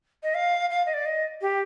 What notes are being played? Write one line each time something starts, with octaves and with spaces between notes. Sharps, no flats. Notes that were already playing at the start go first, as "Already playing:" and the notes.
D#5
F5
F5
D#5
D5
D#5
G4